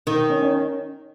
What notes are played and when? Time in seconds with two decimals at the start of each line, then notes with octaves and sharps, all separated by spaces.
0.07 D#3 D#4
0.29 C#4
0.42 C#4